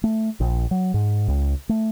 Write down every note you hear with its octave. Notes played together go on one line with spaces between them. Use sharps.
A3
A#1
F#3
G#2
C#2
A3